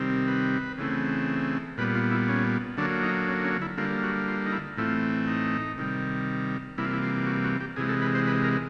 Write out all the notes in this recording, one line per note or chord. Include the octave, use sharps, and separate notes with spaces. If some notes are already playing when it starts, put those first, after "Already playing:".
Already playing: C3 D#3 G3 C4
B4
C#3 E3 A3 C4
A#2 G3 B3 B4
F4
E4
C#4
D3 F#3 A#3 D4
D#4
C#4
C#4
E4
D3 G3 A#3 F4
F#4
F4
D#4
E4
A2 E3 A3 C4 F4
D#4
C3 D#3 G3
C3 E3 G3 A#3 E4
F4
E4
F4
F#4
F#4
G4
C3 E3 G#3 G#4
A4
B4
C5
B4
A#4